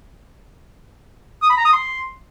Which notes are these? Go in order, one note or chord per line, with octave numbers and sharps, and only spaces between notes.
D#6
B5
A#5
D#6
C6